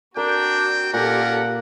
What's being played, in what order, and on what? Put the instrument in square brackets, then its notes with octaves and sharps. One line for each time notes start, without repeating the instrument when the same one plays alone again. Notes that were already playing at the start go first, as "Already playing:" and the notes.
[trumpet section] C4 G5 [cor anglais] D4 [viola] F#4 [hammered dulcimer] A#4
[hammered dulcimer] A#2 [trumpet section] C#4 F4 A#4 [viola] G4 A4 [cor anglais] F#5